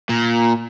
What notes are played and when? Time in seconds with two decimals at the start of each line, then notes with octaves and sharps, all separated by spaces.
0.09 A#2